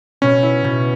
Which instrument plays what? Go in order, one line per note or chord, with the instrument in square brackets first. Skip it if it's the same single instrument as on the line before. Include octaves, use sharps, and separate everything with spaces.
[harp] B2 [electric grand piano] C#4
[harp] E4
B2